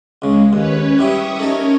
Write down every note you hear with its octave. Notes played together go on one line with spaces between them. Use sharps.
C#2 C#3 G#3
D#2 C#4 B4 C#5
G3 E4 G4 E5 C#6 D#6
A3 C#4 D#4 A4 A#4 C#5